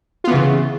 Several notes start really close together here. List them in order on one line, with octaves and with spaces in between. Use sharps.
F4 B3 E3 C#3